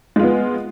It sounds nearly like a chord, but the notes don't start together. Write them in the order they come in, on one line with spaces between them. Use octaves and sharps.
G#3 F4 B3